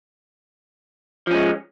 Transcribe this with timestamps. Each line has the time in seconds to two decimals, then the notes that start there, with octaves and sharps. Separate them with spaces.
1.27 F3
1.31 C#4
1.34 G#3